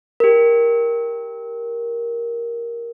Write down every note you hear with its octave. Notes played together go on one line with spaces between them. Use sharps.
G4 A#4